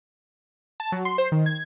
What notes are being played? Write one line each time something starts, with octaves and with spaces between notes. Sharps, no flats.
A5
F#3
C6
C5
D#3
G#6